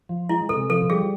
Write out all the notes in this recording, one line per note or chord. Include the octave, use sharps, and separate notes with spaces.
F3
G#3 E4
C3 A4
F3 A4
G3 G#4